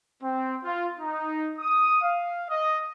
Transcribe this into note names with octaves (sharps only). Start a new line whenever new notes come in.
C4
F4
D#4
D#6
F5
D#5